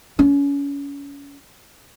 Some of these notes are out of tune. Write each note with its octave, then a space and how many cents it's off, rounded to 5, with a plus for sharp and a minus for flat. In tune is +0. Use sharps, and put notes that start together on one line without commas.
C#4 +30